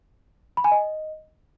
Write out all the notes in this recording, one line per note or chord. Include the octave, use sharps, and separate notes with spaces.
B5
G#5
D#5